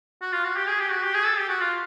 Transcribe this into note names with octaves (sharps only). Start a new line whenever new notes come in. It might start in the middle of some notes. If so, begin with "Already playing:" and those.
F#4
F4
F#4
G4
G#4
G4
F#4
G4
G#4
A4
G4
F#4
F4